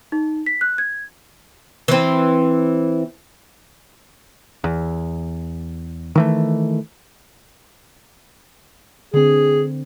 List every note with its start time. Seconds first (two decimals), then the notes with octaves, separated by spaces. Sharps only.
0.12 D#4
0.46 B6
0.61 F#6
0.78 G#6
1.88 E3 C4
4.64 E2
6.15 D#3 E3 A3
9.14 D3 C4 G#4